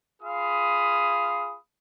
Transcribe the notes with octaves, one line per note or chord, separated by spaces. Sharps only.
F4 G#4 F5 B5 D#6